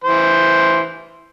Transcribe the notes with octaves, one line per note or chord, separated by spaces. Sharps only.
E3 C5